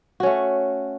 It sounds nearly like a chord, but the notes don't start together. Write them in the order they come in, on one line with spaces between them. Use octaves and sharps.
F#4 C#4 A3